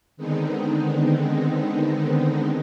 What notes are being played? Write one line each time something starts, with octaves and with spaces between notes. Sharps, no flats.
D3 D#3 G#3 B3 C4 D#4